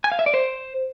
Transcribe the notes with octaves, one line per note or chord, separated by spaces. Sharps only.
G#5
F5
E5
D5
C5